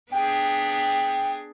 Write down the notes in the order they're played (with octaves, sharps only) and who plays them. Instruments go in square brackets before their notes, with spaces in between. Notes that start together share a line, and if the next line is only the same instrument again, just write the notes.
[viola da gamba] B3 D4 G#4 [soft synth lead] G5